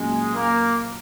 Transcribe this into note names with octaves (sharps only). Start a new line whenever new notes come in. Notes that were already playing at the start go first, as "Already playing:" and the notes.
Already playing: A#2 F#3 G#3 A#3 C#4
A#3